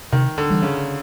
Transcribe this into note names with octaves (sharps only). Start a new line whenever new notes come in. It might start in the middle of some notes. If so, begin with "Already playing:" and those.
C3 D#3
D3
E3 G3
C#3